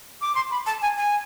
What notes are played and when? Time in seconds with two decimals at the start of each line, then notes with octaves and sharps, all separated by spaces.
0.22 D6
0.35 C6
0.51 B5
0.66 A5
0.82 G#5
0.97 G#5